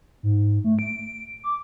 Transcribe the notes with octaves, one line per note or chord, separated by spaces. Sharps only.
G#2
A3
D7
D6